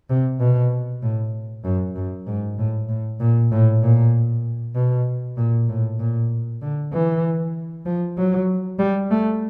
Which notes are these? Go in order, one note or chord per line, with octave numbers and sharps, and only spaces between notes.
C3
B2
A2
F#2
F#2
G#2
A2
A2
A#2
A2
A#2
B2
A#2
A2
A#2
D3
E3
F3
F#3
G3
A3